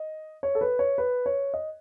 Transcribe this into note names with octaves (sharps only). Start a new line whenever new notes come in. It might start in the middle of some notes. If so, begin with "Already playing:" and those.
Already playing: D#5
C#5
A4
B4
C#5
B4
C#5
D#5